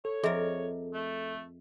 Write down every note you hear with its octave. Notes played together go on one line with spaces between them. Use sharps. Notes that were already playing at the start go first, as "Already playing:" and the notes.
A4 C#5
F2 G#4 A#4 D#5 E5
A3